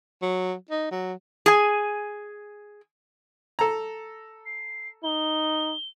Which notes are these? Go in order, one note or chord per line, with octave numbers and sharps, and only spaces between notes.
F#3
D#4
F#3
G#4 G#5
A4 A#5
C7
D#4 G7